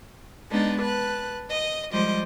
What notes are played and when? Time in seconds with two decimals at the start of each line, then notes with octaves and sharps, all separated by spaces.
0.50 G#3 B3 D4 D#4 A5
0.80 B4 A5 F#6
1.49 D#5 D#6
1.91 F3 G3 G#3 C5 D#5 D6